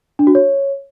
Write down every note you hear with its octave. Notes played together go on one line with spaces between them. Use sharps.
D4
F#4
C#5